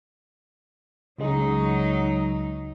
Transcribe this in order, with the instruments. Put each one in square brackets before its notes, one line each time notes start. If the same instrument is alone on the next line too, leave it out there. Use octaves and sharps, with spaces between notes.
[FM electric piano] C#2 C#3 G#3 [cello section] F#3 D#4